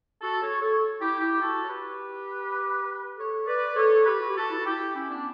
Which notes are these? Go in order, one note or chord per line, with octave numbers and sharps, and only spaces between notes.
F#4 A4
A4 C#5
A4 C#5
E4 G4
E4 G4
F#4 A4
C#5
G4 B4
A4 C#5
B4 D5
A4 C#5
G4 B4
F#4
G4
F#4 A4
E4
F#4
E4 G4
C#4 E4
B3 D4